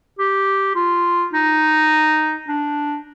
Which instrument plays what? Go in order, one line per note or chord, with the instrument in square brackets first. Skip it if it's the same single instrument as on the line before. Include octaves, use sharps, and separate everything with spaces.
[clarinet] G4
F4
D#4
D4